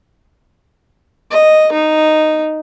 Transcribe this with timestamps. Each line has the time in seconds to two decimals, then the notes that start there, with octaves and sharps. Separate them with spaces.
1.31 D#5
1.72 D#4